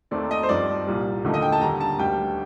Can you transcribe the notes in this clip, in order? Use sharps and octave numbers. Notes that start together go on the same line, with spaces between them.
D#2 D#3 A3 C4 D5
D#5
C5
G2 F3 C4 D#4 D5
C2 A#2 G3
D#2 D3 F3 A3 D#4
D#5
G5
A5
D#2 D3 G3 A#5
A5
D2 D3 G3 A#3 D#4 G5